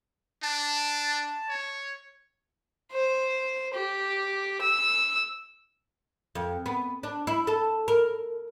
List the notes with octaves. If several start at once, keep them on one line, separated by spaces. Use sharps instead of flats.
D4 A5
C#5
C5
G4
E6
F2
B3
D4
E4
A4
A#4